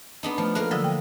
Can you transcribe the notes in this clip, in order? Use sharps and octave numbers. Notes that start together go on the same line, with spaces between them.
B3 D4 D#4
F3 A3
A3 A#3 A#4 F#6
D3 F3 F#3 D#5 E5
G5